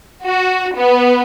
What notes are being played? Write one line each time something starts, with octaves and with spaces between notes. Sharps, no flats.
F#4
B3